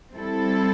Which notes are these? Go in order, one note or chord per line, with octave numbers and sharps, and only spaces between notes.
G3 C4 E4 A4